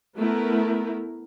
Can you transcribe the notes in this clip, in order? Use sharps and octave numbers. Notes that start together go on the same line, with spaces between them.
A3 B3 E4 A#4